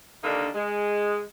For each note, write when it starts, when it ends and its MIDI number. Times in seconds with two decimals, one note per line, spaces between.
0.24 0.49 50
0.24 0.49 51
0.24 0.49 55
0.24 0.49 58
0.24 0.49 62
0.24 0.49 63
0.55 1.22 56